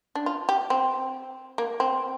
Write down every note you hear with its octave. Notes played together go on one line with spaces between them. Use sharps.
D4
F4
G4
C4
A#3
C4